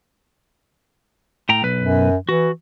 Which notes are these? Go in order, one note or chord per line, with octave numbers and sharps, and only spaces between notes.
A2 G5 A#5
B1 B4
F#2
E3 F#4